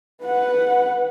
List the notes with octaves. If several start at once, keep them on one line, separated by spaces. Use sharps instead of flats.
B4 F#5